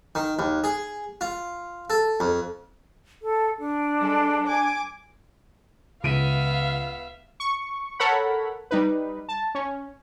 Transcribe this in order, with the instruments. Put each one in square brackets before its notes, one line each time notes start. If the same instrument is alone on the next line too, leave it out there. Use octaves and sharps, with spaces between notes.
[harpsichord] D#3
D#2
G#4
F4
A4
F2
[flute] A4
D4
[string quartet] G3 G#3 A4
G#5 D6
[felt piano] C#2 D7 D#7 [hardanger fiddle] B3 E5 [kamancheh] F5
[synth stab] C#6
A4 A#4 C#5 F#5 B5
G3 D#4 B4
A5
C#4